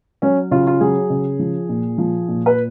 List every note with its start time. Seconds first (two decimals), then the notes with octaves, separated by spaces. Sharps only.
0.22 F#3 C#4
0.51 C#3 F4
0.67 F4
0.81 F#3 G#4
1.10 C#3
1.39 F3
1.69 A#2
1.98 F3
2.28 A#2
2.46 B4